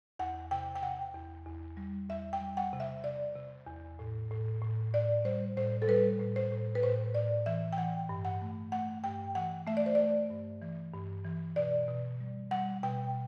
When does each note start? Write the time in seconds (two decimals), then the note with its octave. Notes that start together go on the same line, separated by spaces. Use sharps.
0.19 E2 F#5
0.51 C3 G5
0.76 G5
0.82 C3 F#5
1.15 E2
1.46 E2
1.77 G3
2.09 E2 E5
2.33 G5
2.41 G3
2.57 F#5
2.73 C3
2.80 E5
3.04 C3 D5
3.35 C3
3.67 E2
3.99 A2
4.31 A2
4.62 A2
4.93 A2 D5
5.25 G3 C5
5.57 A2 C5
5.82 A4
5.88 G3 B4
6.20 A2
6.36 C5
6.52 A2
6.75 B4
6.83 A2 C5
7.14 A2 D5
7.46 E3 E5
7.73 G5
7.78 E3 F#5
8.09 G2
8.25 F#5
8.41 A3
8.72 A3 F#5
9.04 G2 G5
9.35 E3 F#5
9.67 A3 E5
9.77 D5
9.86 C5
9.95 A3 D5
10.30 G2
10.62 E3
10.94 G2
11.25 E3
11.56 B2 D5
11.88 B2
12.20 G3
12.51 G3 F#5
12.83 B2 G5